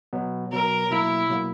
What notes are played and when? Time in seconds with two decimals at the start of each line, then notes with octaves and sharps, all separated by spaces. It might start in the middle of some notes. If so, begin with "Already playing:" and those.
0.13 B2 F#3 B3
0.52 B2 F#3 B3 A#4
0.91 B2 F#3 A#3 E4
1.30 B2 F#3 A#3